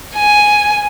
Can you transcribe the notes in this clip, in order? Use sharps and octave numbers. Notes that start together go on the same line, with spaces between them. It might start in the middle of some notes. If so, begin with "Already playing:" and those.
G#5